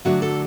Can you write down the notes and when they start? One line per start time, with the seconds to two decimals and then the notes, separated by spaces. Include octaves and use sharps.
0.05 D3 F#3 A3 D4 F#4
0.22 A4